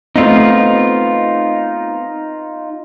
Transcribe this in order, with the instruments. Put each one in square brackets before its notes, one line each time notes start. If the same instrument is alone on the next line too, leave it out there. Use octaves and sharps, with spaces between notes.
[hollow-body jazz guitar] A3 B3 C4 [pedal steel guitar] D#4 F4